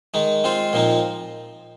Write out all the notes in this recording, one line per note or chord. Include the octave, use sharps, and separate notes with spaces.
D#3 G#3 D#4
G#3 C4 F4 C5
A#2 F3 C4 D#4